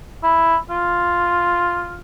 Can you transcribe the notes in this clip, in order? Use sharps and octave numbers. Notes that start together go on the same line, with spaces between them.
E4
F4